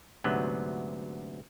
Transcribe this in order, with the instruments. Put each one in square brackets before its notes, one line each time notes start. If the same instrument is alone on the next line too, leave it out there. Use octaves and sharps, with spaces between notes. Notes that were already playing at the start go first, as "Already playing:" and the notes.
[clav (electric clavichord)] D2 G#2 C3 F#3 B3